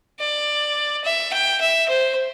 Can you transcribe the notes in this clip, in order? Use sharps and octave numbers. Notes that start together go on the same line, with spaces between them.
D5
E5
G5
E5
C5